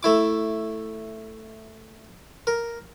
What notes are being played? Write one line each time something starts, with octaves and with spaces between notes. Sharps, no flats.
A3 E4 D6
A#4